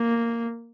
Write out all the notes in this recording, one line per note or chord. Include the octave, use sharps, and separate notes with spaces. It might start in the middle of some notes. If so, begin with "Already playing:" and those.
Already playing: A#3